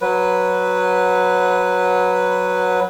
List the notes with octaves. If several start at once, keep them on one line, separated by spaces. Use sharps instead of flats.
F#3 B4